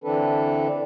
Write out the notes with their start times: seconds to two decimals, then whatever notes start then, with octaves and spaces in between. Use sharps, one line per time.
0.04 D3 E3 C4 D4 A4 B4